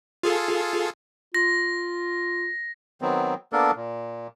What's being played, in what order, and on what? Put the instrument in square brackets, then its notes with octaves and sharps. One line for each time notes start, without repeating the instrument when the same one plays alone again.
[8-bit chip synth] F4 G#4 A4
[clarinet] F4 [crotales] A#6
[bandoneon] D#3 F#3 B3 C4
A#3 B3 D4 A4 A#4
A#2